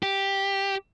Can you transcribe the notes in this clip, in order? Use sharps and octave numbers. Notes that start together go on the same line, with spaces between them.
G4